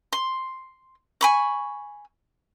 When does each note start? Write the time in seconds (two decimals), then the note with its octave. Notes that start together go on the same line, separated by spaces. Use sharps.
0.13 C6
1.21 G#5 B5 C#6